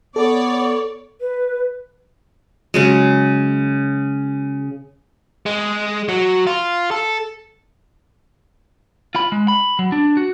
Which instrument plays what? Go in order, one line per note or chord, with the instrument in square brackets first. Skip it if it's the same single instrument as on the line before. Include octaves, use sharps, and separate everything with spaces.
[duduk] B3 [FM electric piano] A4 [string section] C#5 D5
[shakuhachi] B4
[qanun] C#3 F#3 G#3
[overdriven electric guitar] G#3
F#3
F4
A4
[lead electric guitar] F4 B5
G#3
B5
F#3
D4
F#4